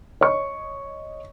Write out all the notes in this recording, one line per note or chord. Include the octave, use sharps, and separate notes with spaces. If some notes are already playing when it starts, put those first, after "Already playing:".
C#5 D#5 C#6